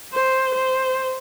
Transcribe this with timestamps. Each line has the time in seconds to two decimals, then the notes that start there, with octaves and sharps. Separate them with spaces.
0.13 C5
0.55 C5